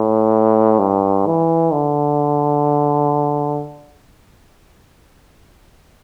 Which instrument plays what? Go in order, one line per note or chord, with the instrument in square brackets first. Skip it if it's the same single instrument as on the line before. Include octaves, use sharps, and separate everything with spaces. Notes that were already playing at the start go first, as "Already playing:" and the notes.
Already playing: [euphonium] A2
G2
E3
D3